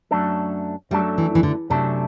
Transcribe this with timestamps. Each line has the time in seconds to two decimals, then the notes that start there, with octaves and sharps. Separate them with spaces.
0.11 F#2 F#3 A3 D4 A4
0.91 F#2 F#3 G3 A3 D4 A4
1.18 E3
1.35 E3
1.43 D3
1.70 F#2 C3 F#3 A3 D4 A4